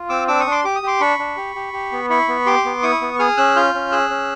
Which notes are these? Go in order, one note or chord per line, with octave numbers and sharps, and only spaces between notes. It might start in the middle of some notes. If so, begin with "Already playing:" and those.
Already playing: F4
C4 D6 E6
D4 D6 E6
C#6 D#6
D4
C6 D6
G4 D6
D#6
G4 C6 D6
D4 B5 C#6
D4
G4
G4
G4
B3
E4 B5 C#6
B3
G4 C6 D6
B3
E4 C#6 D#6
B3
G#4 D#6 F6
C#4 E6 F#6
F4 F6 G6
C#4
G#4 E6 F#6
C#4